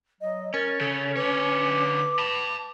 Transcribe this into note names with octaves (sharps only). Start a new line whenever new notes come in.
F#3 D#5
C#4 A#4 A6
C#3 A4
D3 B4 C#5 D6
A5 B5